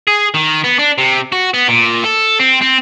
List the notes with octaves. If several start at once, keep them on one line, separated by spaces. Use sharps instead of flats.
G#4
D#3
B3
D4
C3
F#4
B3
A#2
A4
C4
C4